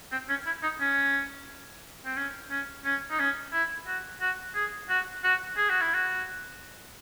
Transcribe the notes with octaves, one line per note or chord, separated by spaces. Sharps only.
C4
C#4
E4
D#4
C#4
C4
C#4
C#4
C#4
D#4
C#4
E4
F#4
F#4
G#4
F#4
F#4
G#4
F#4
E4
F#4